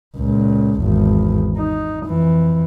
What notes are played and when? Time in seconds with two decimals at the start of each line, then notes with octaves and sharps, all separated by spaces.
0.17 C#2 A#2
0.79 G#1 E2
1.58 D#4
2.06 F2 E3